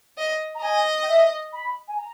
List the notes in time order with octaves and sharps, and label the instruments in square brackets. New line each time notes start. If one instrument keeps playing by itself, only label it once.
[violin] D#5
[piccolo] A#5
[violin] D#5 [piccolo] G#5
[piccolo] G5
E5
B5
G#5
A#5